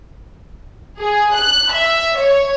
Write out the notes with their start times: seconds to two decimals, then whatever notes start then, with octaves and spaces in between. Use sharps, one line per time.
0.99 G#4
1.35 F#6
1.73 E5
2.20 C#5